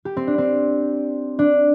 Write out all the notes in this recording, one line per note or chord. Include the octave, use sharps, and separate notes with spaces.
G4
C4
D4
C4
D4